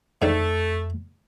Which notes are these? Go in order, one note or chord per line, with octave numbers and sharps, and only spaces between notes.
F2 G#2 D#3 A3 D4